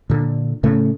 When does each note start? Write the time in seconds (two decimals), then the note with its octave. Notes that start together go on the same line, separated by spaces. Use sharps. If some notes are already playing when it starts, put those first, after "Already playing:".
0.10 A#2 D3
0.63 A2 C#3 A3